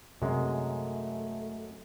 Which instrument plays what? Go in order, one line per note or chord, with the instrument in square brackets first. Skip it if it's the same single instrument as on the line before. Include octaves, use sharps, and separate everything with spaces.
[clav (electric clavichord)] F#2 G#3 [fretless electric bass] C3 [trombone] A3